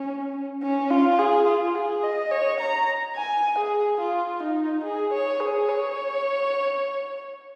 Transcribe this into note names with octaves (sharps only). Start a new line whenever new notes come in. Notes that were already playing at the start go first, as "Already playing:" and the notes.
Already playing: C#4
C#4
F4
G#4
F4
G#4
D#5
C#5
A#5
G#5
G#4
F4
D#4
G#4
C#5
G#4
C#5